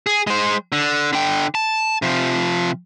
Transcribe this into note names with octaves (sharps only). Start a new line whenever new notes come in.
G#4
G#3 C5
D3
D3 G5
A5
C3 F3